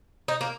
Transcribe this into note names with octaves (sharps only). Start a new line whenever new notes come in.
D#4
A#3